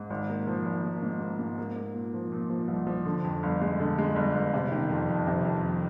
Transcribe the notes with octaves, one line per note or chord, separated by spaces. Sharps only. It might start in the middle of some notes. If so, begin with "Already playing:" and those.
Already playing: G#2
G#1
A#3
F3
G#1
A#3
G#2
A#3
G#2
A#3
A#3
A#2
F3
A#2
F3
C2
F3
D3
F2
G1
G#3
D3
G#3
G1
G1
C3
D#3
F2
F2
C3
F2
D#3